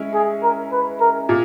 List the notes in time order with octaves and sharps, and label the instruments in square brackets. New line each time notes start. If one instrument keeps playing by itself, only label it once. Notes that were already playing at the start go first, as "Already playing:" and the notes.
Already playing: [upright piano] G#3 C#4 E4
[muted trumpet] G#4
A#4
B4
A#4
[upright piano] A#2